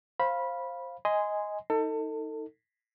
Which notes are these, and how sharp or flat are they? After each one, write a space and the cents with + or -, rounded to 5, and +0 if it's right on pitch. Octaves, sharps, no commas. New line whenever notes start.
C5 +15 F5 +0 B5 -15
D#5 +10 G#5 -5 C6 -20
D#4 +20 A4 +30